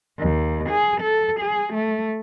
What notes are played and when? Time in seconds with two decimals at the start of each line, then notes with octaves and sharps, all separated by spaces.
0.19 D#2
0.69 G#4
1.01 A4
1.41 G#4
1.74 A3